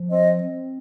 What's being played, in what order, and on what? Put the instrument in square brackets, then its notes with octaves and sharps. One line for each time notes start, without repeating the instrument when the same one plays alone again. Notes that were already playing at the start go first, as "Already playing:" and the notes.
Already playing: [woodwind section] F3
C4 D#5
C4